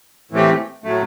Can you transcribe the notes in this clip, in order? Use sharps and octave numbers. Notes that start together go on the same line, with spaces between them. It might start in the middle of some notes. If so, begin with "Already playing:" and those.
A2 E3 A3 C4 G4
A2 F#3 A3